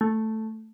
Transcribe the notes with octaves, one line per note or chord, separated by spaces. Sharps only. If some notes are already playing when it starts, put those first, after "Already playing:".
A3